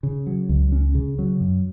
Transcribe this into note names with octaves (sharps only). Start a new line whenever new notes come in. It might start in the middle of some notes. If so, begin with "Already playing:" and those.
C#3
F#3
C#2
C#4
C#3
F#3
F#2